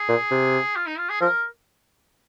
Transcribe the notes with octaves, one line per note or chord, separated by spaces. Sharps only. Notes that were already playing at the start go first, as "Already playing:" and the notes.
Already playing: G#4
A#2
C3
F4
D#4
F4
G#4
F3 A#4